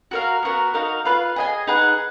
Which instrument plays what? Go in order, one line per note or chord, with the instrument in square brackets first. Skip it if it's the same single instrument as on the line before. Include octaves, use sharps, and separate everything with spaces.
[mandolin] F#4 A#4 F5
B3 F#4 A#4
D#4 F#4 A#4 F5
F4 B4 F5
G#4 D#5 G#5
D#4 G#4 B4 F#5